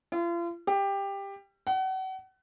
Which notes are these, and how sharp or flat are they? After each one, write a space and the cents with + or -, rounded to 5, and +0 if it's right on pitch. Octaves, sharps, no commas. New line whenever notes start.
F4 -40
G4 +15
F#5 +35